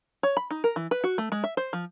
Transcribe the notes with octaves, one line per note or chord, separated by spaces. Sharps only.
C#5
B5
D#4
A#4
E3
B4
F#4
A3
G#3
E5
C5
F3